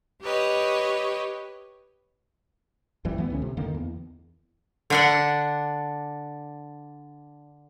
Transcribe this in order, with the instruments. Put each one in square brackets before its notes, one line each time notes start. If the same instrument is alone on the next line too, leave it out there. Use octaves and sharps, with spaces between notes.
[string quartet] G4 B4 C#5 D#5
[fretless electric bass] A#1 F#2 E3 G3
D2 E3 G#3 B3
C#2 D3 C#4
C3
F2 D3 D#3 A#3
E2
[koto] D3 D4 F#5